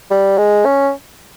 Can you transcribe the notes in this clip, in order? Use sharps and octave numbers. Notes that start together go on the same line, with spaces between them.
G3
G#3
C#4